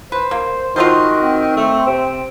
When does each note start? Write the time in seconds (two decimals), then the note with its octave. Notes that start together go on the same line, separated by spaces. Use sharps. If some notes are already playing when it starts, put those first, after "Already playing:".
0.12 B4 C5
0.31 A#3
0.76 D#3 F4 F#4 A4 C5
1.23 C4
1.57 A3
1.86 C3